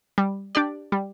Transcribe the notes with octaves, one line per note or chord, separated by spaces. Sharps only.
G3
D4 G4 D5
G3